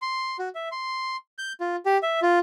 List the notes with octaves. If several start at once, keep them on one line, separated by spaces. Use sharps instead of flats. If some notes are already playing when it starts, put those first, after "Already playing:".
C6
F#4
E5
C6
G6
F4
G4
E5
F4